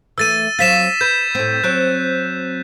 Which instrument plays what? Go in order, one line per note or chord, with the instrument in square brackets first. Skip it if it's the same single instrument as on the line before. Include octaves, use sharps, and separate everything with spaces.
[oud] E3 A3 [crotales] E6 A6 D#7
[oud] F#3 C4 F4 [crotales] A6 B6 E7
[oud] B4 [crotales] G6
[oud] A2 C4
[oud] F#3 C4 [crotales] F#6